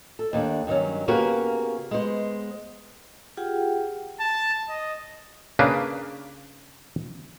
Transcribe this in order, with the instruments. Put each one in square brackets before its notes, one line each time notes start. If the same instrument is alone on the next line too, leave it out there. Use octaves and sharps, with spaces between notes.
[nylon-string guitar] A4
D#2 D#3 D4
G2 D#3 F#3 C#4
C#3 A#3 B3 F#4 G4 A#4
G#3 B3 C5
[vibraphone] F4 G4 G#4 F#5 G5
[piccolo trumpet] A5
D#5
[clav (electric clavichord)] C#3 A#3 D4 B4